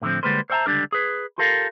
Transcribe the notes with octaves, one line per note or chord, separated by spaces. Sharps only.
A2 D3 D#3 F3 C4
D3 G3 G#3 A#3 B4 C5
C5 C#5 E5 G5 A5 A#5
C#2 D3 G3 D4 A#4
G#4 B4
F4 G4 A4 A#4 F5